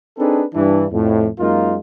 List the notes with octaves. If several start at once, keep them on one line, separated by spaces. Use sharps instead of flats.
C4 D4 D#4 G#4 A4 B4
G2 E3 D4
F2 A2
F#2 G#3 A#3 D#4 F4